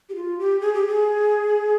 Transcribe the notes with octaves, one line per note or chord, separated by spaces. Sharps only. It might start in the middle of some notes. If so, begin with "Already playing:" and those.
G4
F4
G4
G#4
G4
G#4